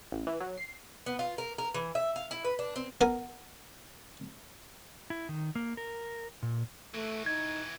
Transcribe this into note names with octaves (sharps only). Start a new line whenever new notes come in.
A1
E3
F#3
C7
B3
F4
A#4
A#4
E3
E5
F5
E4
B4
D4
C4
B3 A#4 G#5
E4
D#3
A#3
A#4
A#2
E3 A3 F#4
D#4 G#6